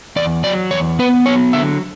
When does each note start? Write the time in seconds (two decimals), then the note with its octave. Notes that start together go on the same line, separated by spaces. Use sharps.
0.16 E2 D5
0.44 F#3 D5
0.71 E2 C#5
0.99 B3 B4
1.26 F#3 C#5
1.53 D3 E5